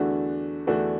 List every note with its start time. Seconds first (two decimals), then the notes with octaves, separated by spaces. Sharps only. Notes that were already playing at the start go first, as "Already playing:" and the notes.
Already playing: E2 D3 A3 D4 F#4
0.67 E2 D3 A3 D4 F#4